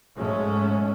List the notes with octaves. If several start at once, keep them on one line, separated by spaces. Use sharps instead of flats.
G#2 F#3 G#3 A3 C#4